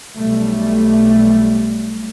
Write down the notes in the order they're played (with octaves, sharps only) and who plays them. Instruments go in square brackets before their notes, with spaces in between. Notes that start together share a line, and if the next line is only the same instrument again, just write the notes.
[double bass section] B1 G3 A3